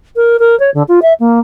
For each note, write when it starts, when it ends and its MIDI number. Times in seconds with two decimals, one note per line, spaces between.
0.16 0.39 70
0.39 0.58 70
0.60 0.70 73
0.74 0.83 50
0.88 1.00 65
1.02 1.13 76
1.20 1.40 58